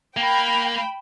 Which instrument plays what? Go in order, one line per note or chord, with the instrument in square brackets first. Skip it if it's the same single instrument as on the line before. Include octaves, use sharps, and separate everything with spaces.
[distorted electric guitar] A#3 [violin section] G5 B5